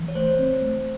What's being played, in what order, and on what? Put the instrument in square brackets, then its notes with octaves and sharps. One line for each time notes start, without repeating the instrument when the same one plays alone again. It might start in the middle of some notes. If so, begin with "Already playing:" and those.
Already playing: [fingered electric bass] E3
[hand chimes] C#5
[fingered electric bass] A3 [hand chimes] C5
[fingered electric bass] C4
A3